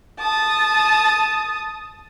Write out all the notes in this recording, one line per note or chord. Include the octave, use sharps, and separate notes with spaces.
A5 D#6